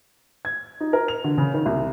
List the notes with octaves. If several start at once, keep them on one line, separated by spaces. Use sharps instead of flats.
G#6
D#4
A#4
F7
D3
C#3
D#3
C2